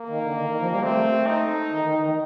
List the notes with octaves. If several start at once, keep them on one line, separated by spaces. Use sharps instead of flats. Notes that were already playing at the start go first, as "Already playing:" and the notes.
Already playing: A#3
D#3
D3
D#3
D#3
F3
G3
A3 C4
D#4
D#3
D#3
D#3